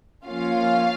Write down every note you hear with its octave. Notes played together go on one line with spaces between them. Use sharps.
F3 A#3 C#4 F4 F5